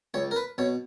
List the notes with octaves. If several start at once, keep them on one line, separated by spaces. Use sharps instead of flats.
C#2 C#5
A#4
B4
B2 C#5